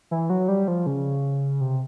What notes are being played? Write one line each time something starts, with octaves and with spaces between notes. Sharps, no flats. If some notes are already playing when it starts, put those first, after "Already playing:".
E3
F#3
G3
F3
C#3
C3